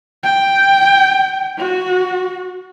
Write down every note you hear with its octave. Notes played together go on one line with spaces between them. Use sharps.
G5
F#4